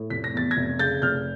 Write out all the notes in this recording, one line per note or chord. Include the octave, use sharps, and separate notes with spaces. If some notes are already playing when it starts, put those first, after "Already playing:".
Already playing: A2
F1 B6
A#6
E2 A6
G#6 A#6
F1
C#3 G6 A6
F1 F6 G6